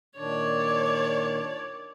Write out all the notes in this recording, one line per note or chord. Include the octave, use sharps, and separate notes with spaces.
A#2 D#3 D4 C#5 D5